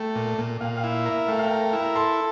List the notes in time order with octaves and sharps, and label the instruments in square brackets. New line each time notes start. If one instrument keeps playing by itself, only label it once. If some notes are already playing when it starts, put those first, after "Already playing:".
Already playing: [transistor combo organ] A3 [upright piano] G5
[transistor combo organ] A#2
A#2
[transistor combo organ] A#2 [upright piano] F5
[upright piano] F5
[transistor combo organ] E4
A#4
[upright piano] E5
[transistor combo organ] A3 [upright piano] F5
[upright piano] F5
G5
[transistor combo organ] A#4
[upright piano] G5
[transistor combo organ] E4
[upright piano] A#5
[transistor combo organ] A4 [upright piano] C6